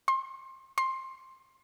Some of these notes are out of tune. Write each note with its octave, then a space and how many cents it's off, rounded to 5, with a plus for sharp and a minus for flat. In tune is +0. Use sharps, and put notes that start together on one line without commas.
C6 +25
C6 +15